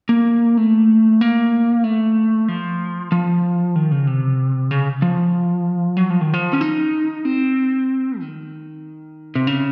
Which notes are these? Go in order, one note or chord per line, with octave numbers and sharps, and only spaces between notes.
A#3
A3
A#3
A3
F3
F3
D#3
C#3
C3
C#3
F3
F#3
F3
D#3
F3
C#4
D#4
C4
D#3
C3
C#3